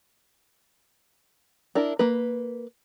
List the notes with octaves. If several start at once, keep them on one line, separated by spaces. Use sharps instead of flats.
D4 E4 A#4
A#3 B4